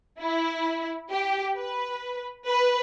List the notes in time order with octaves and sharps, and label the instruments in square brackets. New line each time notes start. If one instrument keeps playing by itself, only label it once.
[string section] E4
G4
B4
B4